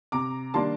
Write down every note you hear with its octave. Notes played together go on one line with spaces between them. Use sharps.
C3 A#5 D6
D#3 G3 A#3 D4 A5 C6